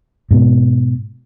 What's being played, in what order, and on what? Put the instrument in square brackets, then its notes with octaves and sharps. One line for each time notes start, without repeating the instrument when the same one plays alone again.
[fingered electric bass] G#2 B2